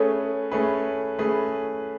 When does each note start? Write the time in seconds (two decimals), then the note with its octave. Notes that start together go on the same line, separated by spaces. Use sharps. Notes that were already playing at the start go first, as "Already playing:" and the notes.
Already playing: A3 C#4 G#4 A4 B4 C#5
0.51 A3 C#4 G#4 B4
1.19 A3 C#4 G#4 B4